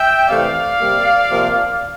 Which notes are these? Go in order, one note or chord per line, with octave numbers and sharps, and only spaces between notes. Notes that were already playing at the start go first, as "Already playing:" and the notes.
Already playing: E5 G5
C3 E3 A3 D5 F5
C3 G3 A#3
C3 F3 A#3